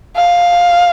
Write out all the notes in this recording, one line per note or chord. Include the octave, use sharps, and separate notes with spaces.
F5